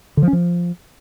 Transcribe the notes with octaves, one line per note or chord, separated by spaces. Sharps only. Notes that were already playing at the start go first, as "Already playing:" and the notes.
D3
F3
C#4
F3